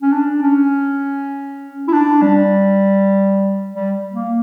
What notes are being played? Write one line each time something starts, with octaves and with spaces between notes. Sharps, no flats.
C#4
D4
C#4
E4
D4
G3
G3
A#3